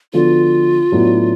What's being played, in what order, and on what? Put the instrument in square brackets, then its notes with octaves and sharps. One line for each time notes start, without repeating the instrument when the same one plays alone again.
[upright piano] D3 F3 B3 F#4 A4 [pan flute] F4
[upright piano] A2 F#3 B3 D4 F#4